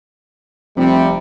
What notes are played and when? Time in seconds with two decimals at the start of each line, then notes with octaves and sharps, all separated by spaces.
0.77 F1 C3 F3 G3